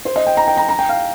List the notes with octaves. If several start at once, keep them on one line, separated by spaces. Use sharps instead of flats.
C5
D#5
G5
A#5
G5
A#5
A#5
G5
F5